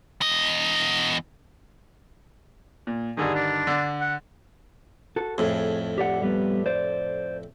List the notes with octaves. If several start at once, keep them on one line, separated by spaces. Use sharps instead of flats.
E2 D#5
A#2
G2 D3 D#3 G#4
D4
D3
F#5
F#4 A4
F2 A2 G#4
G4 D5 F#5
G3 B3
C5 D5